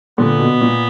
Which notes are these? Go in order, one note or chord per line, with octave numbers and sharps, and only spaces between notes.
A#2 D3 B3
B2
A#2